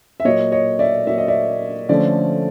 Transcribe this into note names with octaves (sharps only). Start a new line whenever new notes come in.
E5
A#2 F#3 A#3 C#5 D#5
C#5 D#5
D5 E5
A#2 F#3 A#3 E5
D#5
D5 E5
D3 F3 A3 C#4 D5